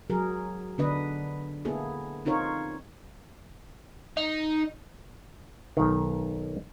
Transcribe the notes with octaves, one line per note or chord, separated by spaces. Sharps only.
F#3 G#4 A#4
D3 B3 D4 B4 D#5
A#3 B3 E4 G#4 A4
C4 D#4 F4 A#4 C#5
D#4
B1 D#3